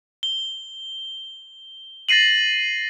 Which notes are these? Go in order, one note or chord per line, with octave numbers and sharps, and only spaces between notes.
G7
A6 A#6 C7 D#7 F#7